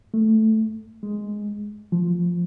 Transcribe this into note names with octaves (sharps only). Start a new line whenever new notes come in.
A3
G#3
F3